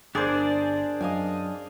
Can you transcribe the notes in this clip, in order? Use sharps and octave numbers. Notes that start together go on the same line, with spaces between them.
G1 D4 G#4 A#4 C5 D5
F#2 D#5 F5 G#5